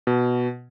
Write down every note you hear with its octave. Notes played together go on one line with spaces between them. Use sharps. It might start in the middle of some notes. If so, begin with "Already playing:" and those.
B2